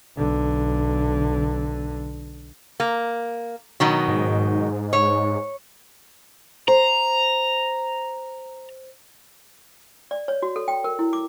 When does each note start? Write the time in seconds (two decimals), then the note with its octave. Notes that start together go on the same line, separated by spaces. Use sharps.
0.17 B1 D3
2.80 A#3
3.80 B2 D#3 F#3
4.08 G#2
4.93 C#5
6.68 C5 A#5
10.11 D5
10.28 C#5
10.42 F#4
10.56 A4
10.68 G5
10.84 A#4
10.99 E4
11.13 D6